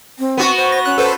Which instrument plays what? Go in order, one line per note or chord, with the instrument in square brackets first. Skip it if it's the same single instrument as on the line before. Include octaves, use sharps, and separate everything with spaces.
[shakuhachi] C4
[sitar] B3 F#4
[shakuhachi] C5
[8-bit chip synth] A#6
[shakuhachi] C#4 [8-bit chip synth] F#6
[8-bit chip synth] A4 B4 C5